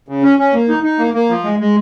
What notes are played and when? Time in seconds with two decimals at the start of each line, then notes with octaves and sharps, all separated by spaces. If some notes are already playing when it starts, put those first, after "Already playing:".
0.08 C#3
0.23 C#4
0.39 C#4
0.53 A#3
0.69 D#4
0.83 D#4
0.99 A#3
1.14 A#3
1.29 F3
1.44 G#3
1.60 G#3